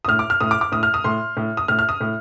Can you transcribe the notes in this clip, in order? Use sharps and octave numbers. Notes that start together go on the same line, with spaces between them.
D#6
A2 F6
D6
F6
A2 D#6
D6
D6
A2 D#6
F6
D#6
A2 C6
A2
D#6
A2 F6
F6
D#6
A2